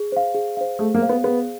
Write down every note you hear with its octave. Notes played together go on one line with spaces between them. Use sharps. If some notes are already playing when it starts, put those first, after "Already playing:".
Already playing: G#4
C5 F5
G#4
C5 F5
A3 G#4
A#3
C5 F5
B3
B3 G#4